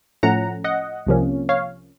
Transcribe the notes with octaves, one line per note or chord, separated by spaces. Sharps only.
A2 F3 A3 C#4 F#5 A#5
D#5 F#5
C2 C3 F3 A#3 C#4
C#5 F5